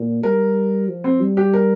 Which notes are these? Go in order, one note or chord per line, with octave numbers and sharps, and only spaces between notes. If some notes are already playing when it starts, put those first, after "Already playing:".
Already playing: A#2
G3 A#4
F3
C4
G3
G4
A#4